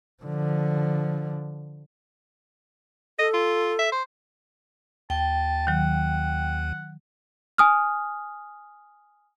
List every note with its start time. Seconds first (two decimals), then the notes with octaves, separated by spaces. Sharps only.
0.23 D3 F3
3.19 A4 D#5
3.34 F4
3.79 E5
3.92 C5
5.10 D#2 G5 A5
5.67 D#3 F#3 F#5
7.58 G#5 D#6 F6